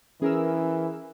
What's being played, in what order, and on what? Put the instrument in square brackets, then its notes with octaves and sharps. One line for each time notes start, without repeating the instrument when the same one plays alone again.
[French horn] E3 [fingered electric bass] C#4 [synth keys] G#4 A#4 E6